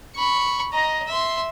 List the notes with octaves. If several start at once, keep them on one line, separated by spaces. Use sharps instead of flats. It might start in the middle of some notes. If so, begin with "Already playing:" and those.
B5 C#6
D#5 A#5
E5 C6